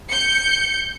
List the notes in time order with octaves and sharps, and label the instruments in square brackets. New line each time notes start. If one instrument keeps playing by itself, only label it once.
[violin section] G6 C#7